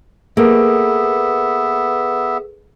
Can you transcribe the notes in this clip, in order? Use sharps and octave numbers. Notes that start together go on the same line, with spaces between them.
A#3 B3 G#4 A4 B4 E5